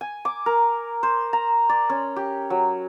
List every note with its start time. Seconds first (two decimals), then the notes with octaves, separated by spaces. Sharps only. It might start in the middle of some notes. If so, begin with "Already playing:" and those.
0.01 G#5
0.25 D6
0.46 A#4
1.03 C5
1.33 A#5
1.69 D5
1.89 C#4
2.16 G4
2.50 F#3